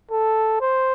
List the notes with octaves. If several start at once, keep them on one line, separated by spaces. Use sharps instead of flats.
A4
C5